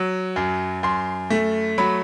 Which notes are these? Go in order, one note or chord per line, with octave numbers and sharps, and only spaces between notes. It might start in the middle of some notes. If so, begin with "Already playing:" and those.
Already playing: F#3
F#2
F#2 C6
A3
F#3 B5